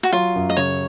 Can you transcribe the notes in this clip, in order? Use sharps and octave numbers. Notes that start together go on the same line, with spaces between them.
F#4
F#3 F4
F#2
D#5
C#3 C#5